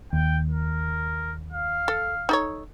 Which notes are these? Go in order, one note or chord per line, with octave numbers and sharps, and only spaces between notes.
D#2 G5
A#4
F5
A4
D#4 A4 C#5